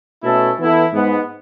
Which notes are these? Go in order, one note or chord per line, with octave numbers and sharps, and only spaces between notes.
B2 A3 C#4 E4 A4
E3 B3 E4 A4
G#2 G#3 B3